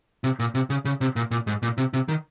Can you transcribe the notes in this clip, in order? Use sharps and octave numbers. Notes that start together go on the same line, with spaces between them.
C3
A#2
C3
C#3
C#3
C3
A#2
A#2
G#2
A#2
C3
C3
D#3